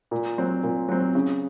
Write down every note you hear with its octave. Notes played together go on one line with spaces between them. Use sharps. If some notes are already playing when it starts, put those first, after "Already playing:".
A#2
F#3 C4
A#2
F#3 C4
C#3